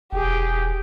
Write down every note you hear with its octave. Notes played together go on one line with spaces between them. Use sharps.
E1 G4 G#4 G5